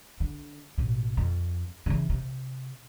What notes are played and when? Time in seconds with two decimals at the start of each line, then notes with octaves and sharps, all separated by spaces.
0.20 D3
0.78 A1 B2
1.17 F2
1.86 C#3 E3
2.10 C3